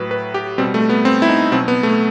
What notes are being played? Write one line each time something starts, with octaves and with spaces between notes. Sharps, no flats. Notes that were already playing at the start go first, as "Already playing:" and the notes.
Already playing: A2 F#3 B4
B4
G4
B2 G3 C4
A3
B3
C4
E4
D#4
B2 F#3 C4
B3
A3